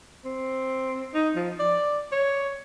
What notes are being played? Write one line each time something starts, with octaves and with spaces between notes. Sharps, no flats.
C4
D#4
F3
D5
C#5